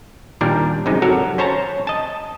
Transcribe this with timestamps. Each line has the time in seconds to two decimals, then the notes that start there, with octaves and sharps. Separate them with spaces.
0.41 D#2 A#2 G3 D4 A#4
0.86 F#2 C3 G#3 D#4
1.02 F#3 F#4 A4 A#4 C#5
1.38 C#4 C5 C#5 A5 A#5
1.87 D#5 A5